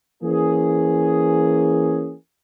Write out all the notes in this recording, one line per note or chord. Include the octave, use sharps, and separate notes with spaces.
E3 A#3 C#4 G#4